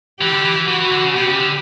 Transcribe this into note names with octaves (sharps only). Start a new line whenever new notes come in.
E3 G4
D3
E3
E3
E3 F#4
E3
D3
C#3
B2 G4
C#3
D3